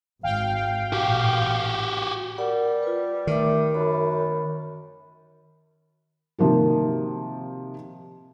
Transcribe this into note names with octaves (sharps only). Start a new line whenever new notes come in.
G#1 F5 G5
A1 A#2 F#4 G4
G3 A#4 F#5
F4 B4
D#3 A3 E5 D6
F#2 B5
C3 D#3 F3 A#3 F#4